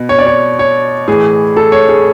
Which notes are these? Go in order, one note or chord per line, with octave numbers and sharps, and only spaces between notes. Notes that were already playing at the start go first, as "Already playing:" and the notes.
Already playing: B2
C#5
D5
C#5
C#5
A2 E3 G#4
A4
C#5
G#4